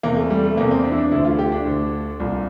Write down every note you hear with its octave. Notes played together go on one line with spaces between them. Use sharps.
E2 C3 E3 A#3
A3
G3
A3
E2 C3 E3 A#3
C4
D4
E4
D4
D2 D3 E4
F4
G4
D4
D2 D3
C2 A#2